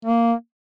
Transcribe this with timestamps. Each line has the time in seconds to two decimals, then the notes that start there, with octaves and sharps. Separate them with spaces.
0.05 A#3